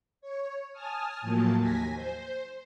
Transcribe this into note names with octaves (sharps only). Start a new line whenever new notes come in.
C#5
G#5 A5 D#6 F6
A2 F3 F#3 A#3 A5
D#2 G#5 A#6 B6
C5